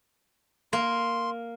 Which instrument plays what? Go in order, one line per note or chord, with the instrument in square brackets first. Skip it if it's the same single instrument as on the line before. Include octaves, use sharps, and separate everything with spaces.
[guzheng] A#3 [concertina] C6